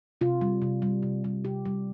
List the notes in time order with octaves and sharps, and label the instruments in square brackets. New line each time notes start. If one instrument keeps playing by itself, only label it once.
[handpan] C3 F4
G3
C3
G3
C3
G3
C3 G4
G3